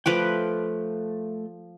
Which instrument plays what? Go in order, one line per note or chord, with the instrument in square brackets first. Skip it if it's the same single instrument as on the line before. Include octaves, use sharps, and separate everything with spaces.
[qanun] F3 B4 D6 [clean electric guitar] A3 A4 G5